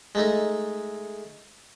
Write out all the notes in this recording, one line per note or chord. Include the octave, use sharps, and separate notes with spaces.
G#3 A3 D#4